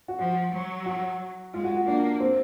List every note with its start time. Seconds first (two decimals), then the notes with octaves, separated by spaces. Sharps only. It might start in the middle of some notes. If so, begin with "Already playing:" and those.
0.08 F#4
0.19 F3 F#4
0.53 F#3
0.86 F#4
1.54 G#3 F4
1.64 F#4
1.76 F#4
1.87 A#3 D4
2.20 C4